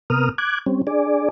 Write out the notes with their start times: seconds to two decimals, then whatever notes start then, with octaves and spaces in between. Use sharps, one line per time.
0.10 C3 B3 A#4 D#6 F6
0.38 D6 F#6 G#6
0.66 G3 C4 C#4
0.87 D4 G#4 D5